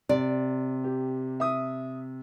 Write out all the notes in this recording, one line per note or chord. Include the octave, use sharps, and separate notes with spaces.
C3 D5
G4
E5 D#6